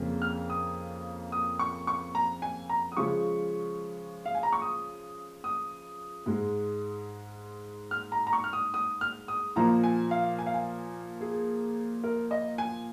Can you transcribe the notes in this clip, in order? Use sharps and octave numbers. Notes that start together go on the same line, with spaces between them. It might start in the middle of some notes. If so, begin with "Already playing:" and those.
Already playing: F2 C#3 A#3
F6
D#6
D#6
C#6
C#6
A#5
G#5
A#5
D#6
C#3 F3 G#3 C#6
F5
G#5
A#5
C#6
D#6
D#6
G#2 G#3
F6
A#5
A#5
C#6
F6
D#6
D#6
F6
D#6
A#2 F3 A#3 A#5
G#5
F5
G#5
F5
G#5
G#4
A#4
D#5
G#5